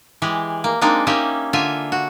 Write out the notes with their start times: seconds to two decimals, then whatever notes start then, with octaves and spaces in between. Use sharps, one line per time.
0.22 E3 G#3 G4
0.64 A#3
0.81 G#3 A#3 C4 D4 D#4
1.07 A#3 C#4 D#4 G4 E5
1.53 D3 F4 E5 G#5
1.92 F#4